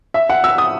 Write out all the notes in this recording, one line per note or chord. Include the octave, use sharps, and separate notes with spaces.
E5
F#5
E6
D#6